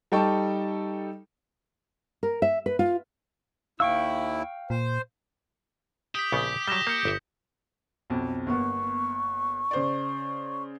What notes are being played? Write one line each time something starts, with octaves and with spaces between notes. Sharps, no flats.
G3 D#4 A4 G5 A5 C#6
A#4
E5
B4
F4
D#2 E4 F5 G5 C#6 E6
A#2 C5
G4 D#6 B6
A#1 C#3 B3
F#3 G3 A#6 E7 G7
A#3 G6 B6 C#7
G1 E5
B1 F2
G1 A#3 B3 C#6
C#3 C5 D5